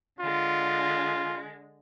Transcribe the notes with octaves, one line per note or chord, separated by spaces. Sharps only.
D3 G#3 F4